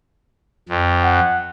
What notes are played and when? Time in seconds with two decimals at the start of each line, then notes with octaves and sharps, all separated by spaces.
0.69 F2
1.03 F#5